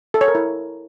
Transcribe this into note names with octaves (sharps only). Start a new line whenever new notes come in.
A4
C#5
A#4
E4